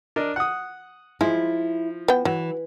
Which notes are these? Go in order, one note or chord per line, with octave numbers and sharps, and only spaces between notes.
D4 A#4 D#5
F#5 D#6
F3 G#3 E4
B3 G5
E3 F#3